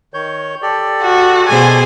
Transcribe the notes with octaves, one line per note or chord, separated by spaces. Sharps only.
D#3 C#5 G6
G4 A4 D5
F#4
B2 G#4 C5 G#5